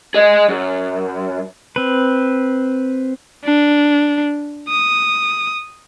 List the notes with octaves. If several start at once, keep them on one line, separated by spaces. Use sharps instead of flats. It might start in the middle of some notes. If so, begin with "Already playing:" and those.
G#4 D#5
F#2
C4 B4
D4
D#6